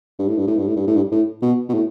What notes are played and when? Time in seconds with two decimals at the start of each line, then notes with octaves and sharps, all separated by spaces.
0.19 G2
0.28 A2
0.38 G2
0.48 A2
0.58 G2
0.67 A2
0.77 G2
0.87 A2
0.96 G2
1.12 A2
1.42 B2
1.69 B2
1.74 A2